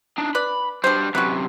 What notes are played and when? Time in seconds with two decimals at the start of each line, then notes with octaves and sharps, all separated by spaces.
0.18 D4 D#4
0.35 B4 D5 B5
0.84 B2 G3 D4 C5
1.15 F#2 C3 F#4 B4